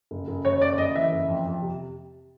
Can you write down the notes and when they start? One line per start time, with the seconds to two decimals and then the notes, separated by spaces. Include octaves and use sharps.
0.11 F#1
0.28 F#1
0.45 F#1 C#5
0.61 F#1 D5
0.78 F#1 D#5
0.95 E3 E5
1.12 F#1
1.28 F2
1.46 F2
1.62 C3